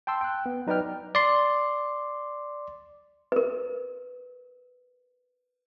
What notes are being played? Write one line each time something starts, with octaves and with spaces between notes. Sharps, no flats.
G5 A5 C6 E6
G5 F#6
B3
F#3 D#4 B4 D5 G5 F6
D5 C6
A#4 B4